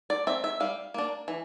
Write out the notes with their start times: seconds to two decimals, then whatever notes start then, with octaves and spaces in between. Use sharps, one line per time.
0.10 D5
0.27 C4 E5
0.44 E5
0.60 G3 F5
0.94 A#3 D4
1.28 E3